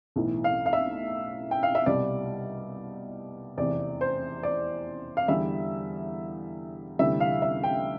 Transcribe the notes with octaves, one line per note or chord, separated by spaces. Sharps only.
B1 A2 E3
F5
F5
E5
G5
F5
E5
C2 B2 G3 D5
F1 E2 C3 D5
C5
D5
F5
E2 D3 G3 E5
D2 C3 E3 G3 E5
F5
E5
G5